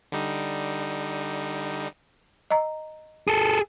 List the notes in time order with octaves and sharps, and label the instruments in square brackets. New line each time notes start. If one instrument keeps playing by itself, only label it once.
[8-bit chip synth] D3 G3 D#4
[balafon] D#5 A#5
[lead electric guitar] G#4 A4